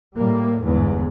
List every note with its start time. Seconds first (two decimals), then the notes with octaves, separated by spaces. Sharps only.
0.15 A2 G3 A#3
0.63 G1 E2 G#2